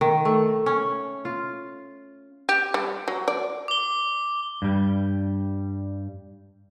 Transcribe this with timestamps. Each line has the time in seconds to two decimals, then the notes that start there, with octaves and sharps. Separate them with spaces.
0.01 D#3
0.25 A3
0.66 C#4
1.25 F4
2.49 G4
2.74 G3
3.08 F#3
3.28 D5
3.68 D6 G7
4.62 G2 G3